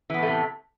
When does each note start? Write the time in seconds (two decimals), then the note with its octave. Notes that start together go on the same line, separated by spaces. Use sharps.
0.10 E3
0.14 B3
0.18 A2
0.23 A3
0.27 C3